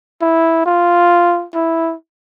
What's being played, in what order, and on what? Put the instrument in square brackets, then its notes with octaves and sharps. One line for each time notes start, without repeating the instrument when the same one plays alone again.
[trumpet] E4
F4
E4